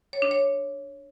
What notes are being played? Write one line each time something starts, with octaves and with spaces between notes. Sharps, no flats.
C#5
D4
C#5